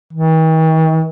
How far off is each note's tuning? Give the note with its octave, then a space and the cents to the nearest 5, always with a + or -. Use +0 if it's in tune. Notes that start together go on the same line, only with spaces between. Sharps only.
D#3 +45